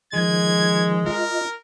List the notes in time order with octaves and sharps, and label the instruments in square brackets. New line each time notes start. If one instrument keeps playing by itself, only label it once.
[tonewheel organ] D#3 F3 [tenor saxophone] G#3 [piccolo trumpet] G#6
[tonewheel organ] F4 D#5 [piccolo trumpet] A#4